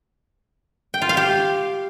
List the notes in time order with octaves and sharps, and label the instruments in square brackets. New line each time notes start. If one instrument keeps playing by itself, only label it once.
[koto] G5
F4
F5
G4